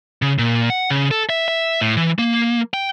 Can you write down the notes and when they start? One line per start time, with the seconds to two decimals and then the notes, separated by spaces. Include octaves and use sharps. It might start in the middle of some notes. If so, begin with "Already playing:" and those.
0.22 C#3
0.39 A#2
0.70 F#5
0.90 C#3
1.11 A4
1.30 E5
1.48 E5
1.81 A2
1.97 E3
2.19 A#3
2.74 G5